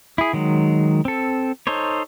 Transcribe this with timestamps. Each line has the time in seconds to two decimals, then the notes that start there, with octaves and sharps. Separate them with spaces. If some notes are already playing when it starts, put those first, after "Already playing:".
0.18 E4 G#4
0.33 D#3 F#3 G#3
1.05 C4 A4
1.67 D#4 A4 C5 C#5